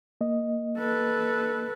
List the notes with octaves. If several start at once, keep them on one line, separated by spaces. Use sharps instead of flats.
A#3 D#5
A4 B4